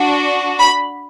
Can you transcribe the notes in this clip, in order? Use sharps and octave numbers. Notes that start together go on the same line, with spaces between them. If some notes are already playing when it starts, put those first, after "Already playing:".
Already playing: D4 F#4
B5